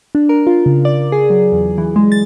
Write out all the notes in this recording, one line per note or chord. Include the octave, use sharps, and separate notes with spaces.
D4
A#4
F4
C#3
D5
G#4
F#3
E2
E3
G#3
A6